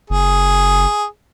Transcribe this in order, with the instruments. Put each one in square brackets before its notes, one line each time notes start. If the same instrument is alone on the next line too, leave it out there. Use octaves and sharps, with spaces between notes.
[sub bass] F#1 [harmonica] G#4